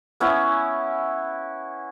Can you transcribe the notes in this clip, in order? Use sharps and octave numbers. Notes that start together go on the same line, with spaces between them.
B3 C#4 E4